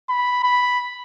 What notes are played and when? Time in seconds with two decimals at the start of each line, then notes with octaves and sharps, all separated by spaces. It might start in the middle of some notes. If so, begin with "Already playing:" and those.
0.09 B5
0.43 B5